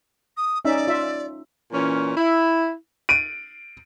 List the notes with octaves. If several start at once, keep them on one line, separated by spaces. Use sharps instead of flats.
D#6
C#4 D#4 D5 E5
F4 E5
A#2 E3 C#4
E4
D7 D#7